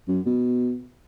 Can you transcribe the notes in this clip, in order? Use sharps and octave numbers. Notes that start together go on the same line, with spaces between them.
F#2
B2